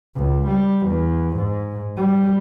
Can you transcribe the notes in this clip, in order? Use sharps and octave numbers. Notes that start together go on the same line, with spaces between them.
C#2
G3
E2
G#2
G3